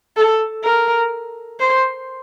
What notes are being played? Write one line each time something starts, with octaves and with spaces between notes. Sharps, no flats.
A4
A#4
C5